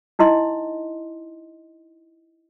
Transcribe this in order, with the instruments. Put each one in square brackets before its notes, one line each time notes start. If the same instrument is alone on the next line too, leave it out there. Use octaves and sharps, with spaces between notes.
[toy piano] D#4 E4 D#5 C6